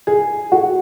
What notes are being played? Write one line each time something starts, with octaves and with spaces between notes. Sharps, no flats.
G#4
F#4